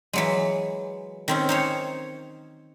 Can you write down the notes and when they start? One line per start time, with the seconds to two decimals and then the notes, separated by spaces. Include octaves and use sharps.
0.13 E3 F#3 G#3
1.28 D#3 C4 C#4
1.49 D#4 C5 C#5